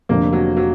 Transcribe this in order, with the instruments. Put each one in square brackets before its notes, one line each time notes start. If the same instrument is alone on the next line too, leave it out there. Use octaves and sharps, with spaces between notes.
[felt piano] F1 F2 D3 [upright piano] A#3
[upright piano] F#3
F#3